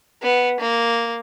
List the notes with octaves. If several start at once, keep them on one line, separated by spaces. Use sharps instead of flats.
B3
A#3